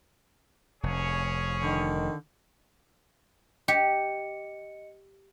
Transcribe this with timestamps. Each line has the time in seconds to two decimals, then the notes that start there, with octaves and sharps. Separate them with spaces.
0.83 F1 C#4 G#4 C#5
1.62 D3 D#3
3.68 G4 D#5 C#7